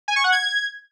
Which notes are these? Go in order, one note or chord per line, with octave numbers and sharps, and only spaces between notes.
G#5
C#6
F#5
G#6